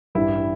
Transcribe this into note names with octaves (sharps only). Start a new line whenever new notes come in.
A1 G2 E3 G3 E4